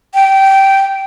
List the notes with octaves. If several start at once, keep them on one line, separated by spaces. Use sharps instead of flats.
G5